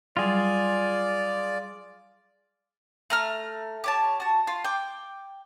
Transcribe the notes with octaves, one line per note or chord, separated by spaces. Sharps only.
F#3 G3 F4 G#4 D5
A3 A#5 F6
G4 C#5 A5
F#4 A5
F4
G5 D6